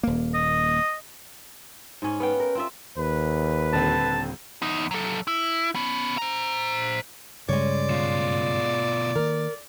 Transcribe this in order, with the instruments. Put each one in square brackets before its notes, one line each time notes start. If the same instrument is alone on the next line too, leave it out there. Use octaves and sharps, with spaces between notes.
[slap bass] D#1 A#3
[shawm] D#5
[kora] G#2 C#4
[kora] B3 F5 G5 [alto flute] B4
[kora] A#4
C4 F4 E5
[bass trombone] D#2 [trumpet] B4
[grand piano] D#1 D3 C4 [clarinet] A5
[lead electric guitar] E2 D#4
F#3 A4
E4
B3 C#4
C5 A#5
[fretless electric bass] G2 C#3 G3 [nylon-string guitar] G#3 C#5 [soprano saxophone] D5
[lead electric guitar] B2 F4
[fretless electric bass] D#3 A#3 [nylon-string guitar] A#4